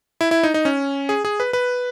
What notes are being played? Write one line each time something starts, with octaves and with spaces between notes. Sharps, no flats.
E4
E4
D#4
D#4
C#4
G#4
G#4
B4
B4